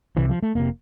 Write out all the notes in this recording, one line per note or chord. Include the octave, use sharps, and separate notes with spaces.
C2 C3 E3
F3
A3
F1 C3 A#3